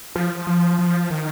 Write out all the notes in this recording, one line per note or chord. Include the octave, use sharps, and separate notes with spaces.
F3
F3
F3
D#3